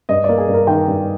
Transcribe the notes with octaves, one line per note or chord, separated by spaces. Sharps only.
G2 D#5
A#3 D5
G#4
G2
A#4
D#3 G5
G2